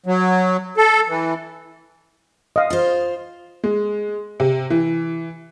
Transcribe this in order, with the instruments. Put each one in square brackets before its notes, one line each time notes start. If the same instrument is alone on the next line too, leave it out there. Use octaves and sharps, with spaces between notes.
[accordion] F#3
A4
E3
[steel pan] D#5 F5
[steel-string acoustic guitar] F4 C5
[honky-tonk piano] G#3
C3
E3